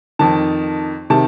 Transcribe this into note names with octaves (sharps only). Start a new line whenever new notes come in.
F2 D#3 A5
C3 D#3 A5